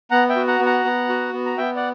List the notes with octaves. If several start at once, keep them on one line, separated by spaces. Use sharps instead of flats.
B3 F#5 A#5
E5 G5
F#4
F#5 A#5
B3
F#5 A#5
B3
F#4
B3
A#5
B3 E5 G5
D5 F#5